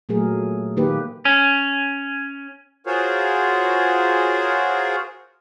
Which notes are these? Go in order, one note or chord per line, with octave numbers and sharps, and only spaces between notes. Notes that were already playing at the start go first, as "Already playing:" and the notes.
A#2 F#3 A3 G#4 A#4
D#3 A#3 G4 B4
C#4
F4 F#4 G#4 A#4 C5 C#5